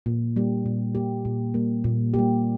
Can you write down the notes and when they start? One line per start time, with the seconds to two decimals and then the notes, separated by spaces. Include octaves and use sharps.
0.06 A#2
0.36 G3 A#3 G4
0.66 A#2
0.95 G3 A#3 G4
1.25 A#2
1.54 G3 A#3 G4
1.84 A#2
2.14 G3 A#3 G4